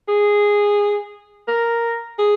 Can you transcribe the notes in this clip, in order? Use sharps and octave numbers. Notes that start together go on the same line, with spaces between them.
G#4
A#4
G#4